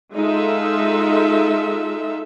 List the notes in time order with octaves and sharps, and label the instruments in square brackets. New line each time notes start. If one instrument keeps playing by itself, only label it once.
[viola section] G#3 D#4 F4 A4 E5